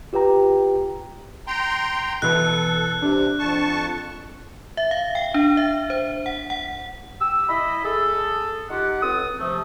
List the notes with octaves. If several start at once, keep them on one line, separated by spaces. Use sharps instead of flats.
F4 G4 B4 G5 A#5
G5 A#5 C6
B2 E3 A4 B4 F#6
C3 D4
F2 A5 C#6
E5
F5
G5
D4
E5
C5
F#5
F#5
G4 E6
E4 D#5 B5
G#4 A4
D#4 F4 G4 F#5
C#2 C4 A4 D#6
C3 F3 A3